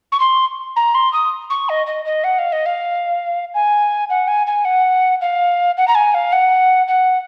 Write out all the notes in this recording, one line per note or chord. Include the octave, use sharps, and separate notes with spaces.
C#6
C6
A#5
C6
D#6
C#6
D#5
D#5
D#5
F#5
F5
D#5
F5
G#5
F#5
G#5
G#5
F#5
F5
F#5
A#5
G#5
F5
F#5
F#5